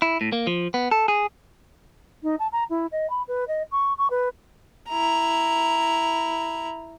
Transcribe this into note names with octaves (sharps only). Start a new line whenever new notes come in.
E4
A2
A#3
F3
B3
A4
G#4
D#4
A5
A#5
E4
D#5
B5
B4
D#5
C#6
C#6
B4
E4 A#5